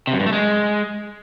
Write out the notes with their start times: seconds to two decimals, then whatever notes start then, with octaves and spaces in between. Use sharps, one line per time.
0.07 C3
0.14 F#2
0.20 G2
0.26 A3
0.33 G#3